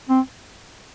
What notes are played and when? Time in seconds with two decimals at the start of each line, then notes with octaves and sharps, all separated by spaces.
0.09 C4